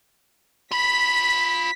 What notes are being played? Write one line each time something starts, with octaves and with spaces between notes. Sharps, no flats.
F4 B5 B6